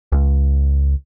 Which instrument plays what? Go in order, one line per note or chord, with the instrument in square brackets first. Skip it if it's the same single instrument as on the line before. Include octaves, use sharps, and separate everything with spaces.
[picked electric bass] C#2